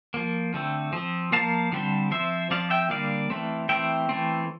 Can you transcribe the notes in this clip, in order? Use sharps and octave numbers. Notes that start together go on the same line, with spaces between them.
F3 A#3
D3 A3 C4
F3 C4
F3 A#3 F5 A5
D3 G3 C4
F3 C4 C5 E5
F3 C4 D5 F5
E5 G5
D3 G3 A#3 D5 F5
E3 A3 C4
E3 A3 C4 E5 G5
E3 A3 C4